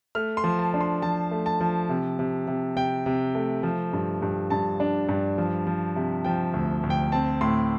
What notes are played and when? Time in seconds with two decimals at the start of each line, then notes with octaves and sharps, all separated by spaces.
0.15 A3 F6
0.37 C6
0.44 F3
0.59 A5
0.74 D4
0.81 C6
1.02 F3 A5
1.31 A3
1.46 A5
1.61 F3
1.89 C3
2.19 C3
2.47 C3
2.76 C3 G5
3.06 C3
3.35 A3
3.63 F3
3.93 G2
4.22 G2
4.50 G2 A5
4.80 D4
5.09 G2
5.38 F3
5.67 F3
5.96 C3
6.25 F3 G5
6.54 D2
6.83 D2
6.90 G5
7.12 C4 A5
7.41 A2 C6